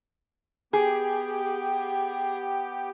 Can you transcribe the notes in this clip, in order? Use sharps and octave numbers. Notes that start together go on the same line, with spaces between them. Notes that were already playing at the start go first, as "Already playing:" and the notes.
B3 G4 G#4 G5